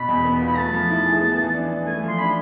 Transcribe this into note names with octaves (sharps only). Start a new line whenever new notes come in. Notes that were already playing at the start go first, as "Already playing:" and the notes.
Already playing: B2 B5
E2
B3
F4
B5
A3 A5
F3
E4
G#4
B3
E3
D4
E3
A3 G#5
F3
C6
D4 B5